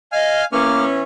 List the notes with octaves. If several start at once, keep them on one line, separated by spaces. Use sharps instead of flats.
D#5 F5 G#5 F6
E3 A#3 B3 C#4 D6 F6